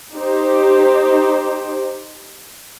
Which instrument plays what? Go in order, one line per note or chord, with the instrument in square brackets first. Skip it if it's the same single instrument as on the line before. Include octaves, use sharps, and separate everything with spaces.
[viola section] D#4 G4 C5